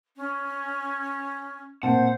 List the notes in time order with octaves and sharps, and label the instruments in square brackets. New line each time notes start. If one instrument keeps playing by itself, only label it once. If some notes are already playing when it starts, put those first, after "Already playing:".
[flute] C#4
[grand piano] A#2 C4 A5 [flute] C5 [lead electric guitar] F#5